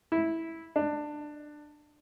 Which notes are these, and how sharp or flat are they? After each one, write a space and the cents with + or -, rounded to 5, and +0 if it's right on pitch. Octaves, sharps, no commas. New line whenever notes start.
E4 -10
D4 +20